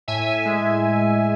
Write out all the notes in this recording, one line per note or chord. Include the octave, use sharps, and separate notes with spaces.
A2 E5 G#5
G#3